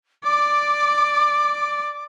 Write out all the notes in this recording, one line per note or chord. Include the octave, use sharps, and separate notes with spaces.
D5 D6